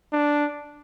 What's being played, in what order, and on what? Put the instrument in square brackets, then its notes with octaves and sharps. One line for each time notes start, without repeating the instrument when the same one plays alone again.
[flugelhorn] D4